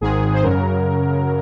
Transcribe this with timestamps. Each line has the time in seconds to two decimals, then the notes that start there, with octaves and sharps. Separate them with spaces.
0.01 G#1 G#2 D#3 G#3 G#4
0.33 C5
0.43 F#2 C#3 F#3 A#4